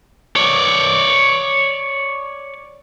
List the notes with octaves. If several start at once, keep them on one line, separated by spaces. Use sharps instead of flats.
C#5 D5